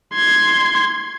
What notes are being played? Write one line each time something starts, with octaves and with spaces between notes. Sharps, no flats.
C6 G#6